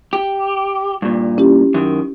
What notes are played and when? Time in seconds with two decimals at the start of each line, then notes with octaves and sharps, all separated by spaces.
0.13 G4
1.02 G2 A#2
1.38 C#4 E4 G4
1.74 F#2 D#3